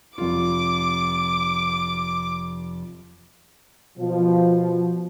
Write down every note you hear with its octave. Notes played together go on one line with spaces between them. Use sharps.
F1 F4 D6
B2 F3